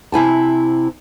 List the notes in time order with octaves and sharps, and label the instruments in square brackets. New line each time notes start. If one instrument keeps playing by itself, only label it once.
[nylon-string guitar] C3 E4 G#5 A5